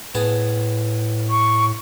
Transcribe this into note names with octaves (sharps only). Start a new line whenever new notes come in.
A2 B3 G#4 A5
C#6